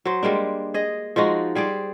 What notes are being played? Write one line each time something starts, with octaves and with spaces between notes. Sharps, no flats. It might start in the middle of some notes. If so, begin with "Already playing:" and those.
F#3 C5
G3 G#3 A#3 D4
G#4 D#5
F3 G#3 D#4 F#4
G3 G#4 C5 D5